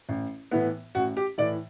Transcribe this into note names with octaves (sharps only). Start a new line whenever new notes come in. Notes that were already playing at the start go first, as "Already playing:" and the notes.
A1
A2 E3 B3
A1 F#4
G4
A2 E3 D5